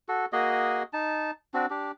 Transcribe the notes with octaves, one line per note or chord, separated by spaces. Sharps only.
F#4 A4
A#3 F#4 G#4 D#5
D#4 A5
C4 D4 F#4
D4 G4